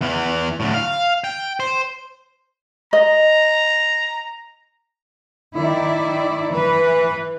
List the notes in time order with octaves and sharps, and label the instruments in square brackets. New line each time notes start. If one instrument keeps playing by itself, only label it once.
[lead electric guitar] E2 E3
D2 A2
F5
G5
C5
[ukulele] D#5 [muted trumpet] A#5
[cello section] D#3 E4 D5
E3 B4